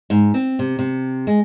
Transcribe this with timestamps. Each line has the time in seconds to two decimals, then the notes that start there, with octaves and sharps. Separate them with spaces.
0.10 G#2
0.34 C4
0.59 C3
0.79 C3
1.27 G#3